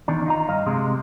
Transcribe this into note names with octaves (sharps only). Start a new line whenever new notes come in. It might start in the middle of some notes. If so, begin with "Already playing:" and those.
E2 D#3 D4
D#4 F4 A#5
G2 D#5 F5
C3 G#3